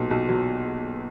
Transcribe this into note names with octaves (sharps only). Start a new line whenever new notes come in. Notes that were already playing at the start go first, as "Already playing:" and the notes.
Already playing: B1 A#2
B1
F#3